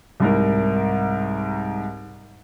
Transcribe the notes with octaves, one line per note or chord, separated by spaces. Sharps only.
C2 G#2 A#4